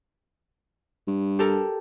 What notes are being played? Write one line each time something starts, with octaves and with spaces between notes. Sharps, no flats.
G2
G4 A4 A#4